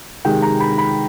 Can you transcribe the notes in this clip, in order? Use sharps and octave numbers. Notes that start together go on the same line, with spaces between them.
C3 D#3 G#3 G5
A#5
B5
B5